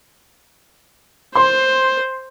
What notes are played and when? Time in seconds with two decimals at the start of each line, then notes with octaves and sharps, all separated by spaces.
1.35 C5 C6